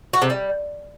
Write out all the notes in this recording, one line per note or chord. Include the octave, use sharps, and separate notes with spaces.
F#4
C3
G3